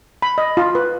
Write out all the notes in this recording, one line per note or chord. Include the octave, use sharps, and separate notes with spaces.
B5
D#5
F4
B4